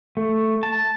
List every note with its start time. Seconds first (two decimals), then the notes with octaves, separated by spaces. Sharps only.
0.17 A3
0.63 A5